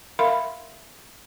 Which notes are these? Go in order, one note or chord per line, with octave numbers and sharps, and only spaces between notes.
A#4 E5 F5 B5 C6